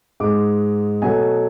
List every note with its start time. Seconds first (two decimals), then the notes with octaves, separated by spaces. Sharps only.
0.20 G#2 G#3 D6
1.02 B2 F#3 A3 G#5